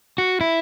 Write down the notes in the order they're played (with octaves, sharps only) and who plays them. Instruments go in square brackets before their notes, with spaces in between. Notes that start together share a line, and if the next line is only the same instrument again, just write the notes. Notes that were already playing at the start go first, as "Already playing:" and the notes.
[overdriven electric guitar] F#4
E4